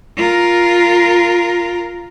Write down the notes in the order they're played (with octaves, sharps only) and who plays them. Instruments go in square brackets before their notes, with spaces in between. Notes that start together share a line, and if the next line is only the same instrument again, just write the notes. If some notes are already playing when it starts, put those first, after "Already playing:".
[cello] F4 A#4